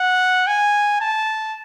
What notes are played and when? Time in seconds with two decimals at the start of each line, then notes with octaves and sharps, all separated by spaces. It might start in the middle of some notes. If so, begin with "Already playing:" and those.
Already playing: F#5
0.47 G#5
1.01 A5